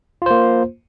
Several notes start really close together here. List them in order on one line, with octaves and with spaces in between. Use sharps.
F4 C5 A#3